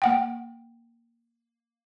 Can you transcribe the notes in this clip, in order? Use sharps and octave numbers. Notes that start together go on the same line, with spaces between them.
A#3 F#5 G5